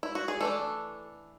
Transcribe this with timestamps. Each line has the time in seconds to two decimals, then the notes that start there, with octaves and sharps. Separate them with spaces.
0.03 E4
0.15 F#4
0.28 G#4
0.41 E3 A3 D4 A4